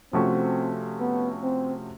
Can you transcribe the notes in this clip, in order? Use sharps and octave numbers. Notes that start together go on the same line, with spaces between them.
C3 F3 A3 C4 C#4 F#4
B3
C4